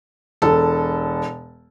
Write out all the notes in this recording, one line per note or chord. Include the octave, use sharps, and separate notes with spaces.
E1 A4